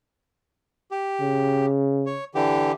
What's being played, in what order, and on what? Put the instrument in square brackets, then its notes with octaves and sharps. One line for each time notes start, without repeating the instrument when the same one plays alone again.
[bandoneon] G4
[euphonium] C#3
[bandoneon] C#5
D3 E3 G4